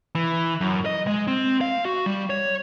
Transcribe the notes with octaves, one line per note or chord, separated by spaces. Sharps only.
E3
F#2
D#5
G#3
C4
F5
F#4
G3
C#5